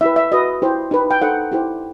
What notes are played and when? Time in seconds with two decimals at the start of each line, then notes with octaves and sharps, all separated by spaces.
0.01 E4 G4 B4 E5
0.16 E5
0.32 F#4 B4 D#5
0.62 E4 G4 C5
0.91 D#4 G4 B4
1.11 G5
1.21 D#4 A4 C5 F#5
1.52 E4 G4 C5